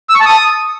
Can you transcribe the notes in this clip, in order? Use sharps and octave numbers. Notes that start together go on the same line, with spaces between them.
E6
C#6
A5
D#6